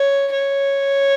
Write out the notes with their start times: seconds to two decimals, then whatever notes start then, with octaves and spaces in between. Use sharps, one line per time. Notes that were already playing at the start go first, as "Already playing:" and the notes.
Already playing: C#5
0.32 C#5